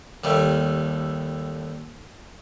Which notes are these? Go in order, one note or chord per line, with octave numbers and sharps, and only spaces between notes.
D#2 G3 A3